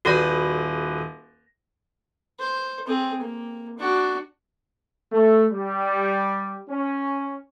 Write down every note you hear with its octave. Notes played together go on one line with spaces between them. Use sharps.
D#1 F#4 B4 D5 A#6
C5
C4 G#4
A#3
D4 F#4
A3
G3
C#4